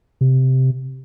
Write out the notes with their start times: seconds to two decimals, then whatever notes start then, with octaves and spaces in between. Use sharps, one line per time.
0.21 C3